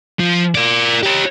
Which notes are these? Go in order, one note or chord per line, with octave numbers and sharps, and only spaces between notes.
F3
A#4 D5
G4 C#5